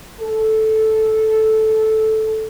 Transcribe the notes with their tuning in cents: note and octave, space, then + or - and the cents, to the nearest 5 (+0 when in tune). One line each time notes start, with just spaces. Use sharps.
A4 -5